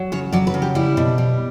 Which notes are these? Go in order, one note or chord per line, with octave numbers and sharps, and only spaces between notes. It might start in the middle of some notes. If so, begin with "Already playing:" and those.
Already playing: F#3
C#3 C#5
F#3 D5
B4
C#3
G4
G3 E4
B2
G3